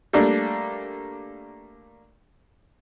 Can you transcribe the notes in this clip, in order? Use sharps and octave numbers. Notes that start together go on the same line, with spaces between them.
G3 A3 A#3 D4